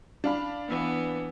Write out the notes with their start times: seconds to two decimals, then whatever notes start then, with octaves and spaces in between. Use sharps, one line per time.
0.24 D4 F5 B5
0.68 E3 B3